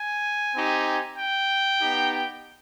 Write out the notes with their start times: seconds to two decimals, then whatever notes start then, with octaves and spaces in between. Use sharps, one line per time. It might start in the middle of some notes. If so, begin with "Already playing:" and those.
Already playing: G#5
0.55 C4 D#4 G4
1.17 G5
1.79 B3 D#4 G4